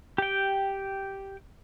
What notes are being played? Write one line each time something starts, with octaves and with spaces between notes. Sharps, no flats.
G4 G5